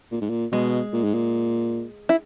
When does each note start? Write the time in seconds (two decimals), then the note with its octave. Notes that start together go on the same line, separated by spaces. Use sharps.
0.12 A#2
0.21 G#2
0.30 A#2
0.52 B2 G#3
0.93 A#2
1.04 G#2
1.14 A#2
2.09 E4